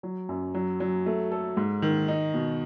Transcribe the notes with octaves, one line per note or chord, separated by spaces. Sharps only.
F#3
F#2
F#3
F#3
A3
A4
G#2
D#3
D#4
B2